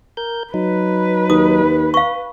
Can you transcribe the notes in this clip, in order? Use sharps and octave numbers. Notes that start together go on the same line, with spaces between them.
A#4 G6
F#3 D#4 B4
D#2 D#6
F5 C#6